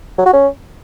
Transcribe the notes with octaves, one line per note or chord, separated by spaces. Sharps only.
F#3
F#4
C#4